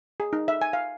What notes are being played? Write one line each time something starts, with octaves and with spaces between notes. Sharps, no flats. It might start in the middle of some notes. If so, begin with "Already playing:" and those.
G#4
D#4
E5
G#5
F5